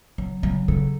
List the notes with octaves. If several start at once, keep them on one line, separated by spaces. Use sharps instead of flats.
C#3 F#3
C#3 F#3
C#3 A4